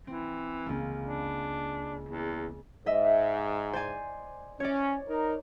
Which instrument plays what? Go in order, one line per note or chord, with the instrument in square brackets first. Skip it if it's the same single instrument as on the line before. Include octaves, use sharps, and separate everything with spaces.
[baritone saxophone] E3 [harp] C4
[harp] C#2 A#3
[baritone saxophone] D4
E2
[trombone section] G#2 [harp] D#5 E5
[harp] C5 D5 G#5
[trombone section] C#4 [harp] C#5 D5
[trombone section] D#4 A#4